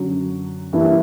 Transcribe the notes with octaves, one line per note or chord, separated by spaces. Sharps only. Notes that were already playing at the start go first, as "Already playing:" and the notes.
Already playing: F#2 D3 F#3
G2 E3 A#3 E4